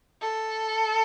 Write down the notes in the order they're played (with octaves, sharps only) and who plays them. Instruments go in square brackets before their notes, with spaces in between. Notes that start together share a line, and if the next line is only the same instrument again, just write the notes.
[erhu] A4